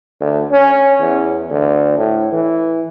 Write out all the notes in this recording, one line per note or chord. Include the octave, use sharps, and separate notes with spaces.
D2
C#4
E2
D2
A2
E3